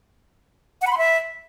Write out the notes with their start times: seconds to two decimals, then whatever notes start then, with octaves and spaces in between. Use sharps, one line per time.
0.82 F#5
0.87 B5
0.92 C6
0.98 E5